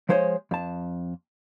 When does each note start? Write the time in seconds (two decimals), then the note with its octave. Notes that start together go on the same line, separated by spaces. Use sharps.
0.09 F3 G#3 C5 C#5 D#5
0.51 F2 A5